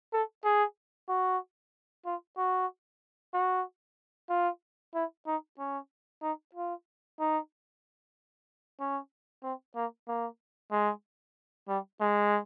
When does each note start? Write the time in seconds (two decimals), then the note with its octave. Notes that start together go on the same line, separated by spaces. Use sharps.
0.13 A4
0.44 G#4
1.09 F#4
2.06 F4
2.37 F#4
3.34 F#4
4.30 F4
4.95 E4
5.27 D#4
5.59 C#4
6.22 D#4
6.55 F4
7.19 D#4
8.80 C#4
9.43 C4
9.76 A#3
10.08 A#3
10.72 G#3
11.69 G3
12.01 G#3